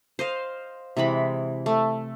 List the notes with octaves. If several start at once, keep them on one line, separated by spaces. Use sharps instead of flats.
C5 D#5 F5
C3 E3 G#3 B5
A3